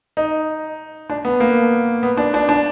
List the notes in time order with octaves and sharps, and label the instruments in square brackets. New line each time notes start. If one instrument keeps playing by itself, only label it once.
[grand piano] D#4
D4
B3
A#3
B3
D4
D4
D4